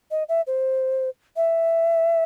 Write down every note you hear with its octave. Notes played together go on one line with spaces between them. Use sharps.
D#5
E5
C5
E5